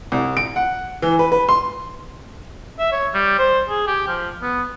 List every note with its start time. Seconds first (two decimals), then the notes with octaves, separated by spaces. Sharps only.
0.12 C2
0.37 D7
0.56 F#5
1.02 E3
1.19 B4
1.32 B4
1.49 C6
2.79 E5
2.92 C#5
3.14 G3
3.39 C5
3.69 G#4
3.87 G4
4.08 F3
4.42 B3